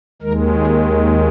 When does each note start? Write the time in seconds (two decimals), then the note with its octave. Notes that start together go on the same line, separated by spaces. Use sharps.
0.22 D#2 D#3 G#3 A#4
0.55 G#4